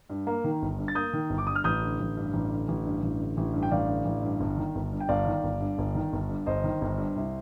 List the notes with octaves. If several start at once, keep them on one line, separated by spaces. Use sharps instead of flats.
G2
A#3
D#3
G1
G2
A6
A#3 D#6 G6
D#3
G1
D6
G2 D#6
F6
A1 D#6 G6
D3
A1
G2
A1
D3
A1
G2
A1
D3
A1
G2
G5
A1 D5 F5
D3
A1
G2
G1
D#3
G1
G2
G5
G1 D5 F5
D#3
G1
G2
G1
D#3
G1
G2
G1 C5 D#5
D#3
G1
G2
C2